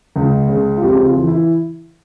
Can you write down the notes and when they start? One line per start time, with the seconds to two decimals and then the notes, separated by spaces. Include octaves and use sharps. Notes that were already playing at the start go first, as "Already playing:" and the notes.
0.16 C#2
0.49 C#3
0.77 F4
0.82 F2 G4
1.05 F4
1.16 E3
1.27 E4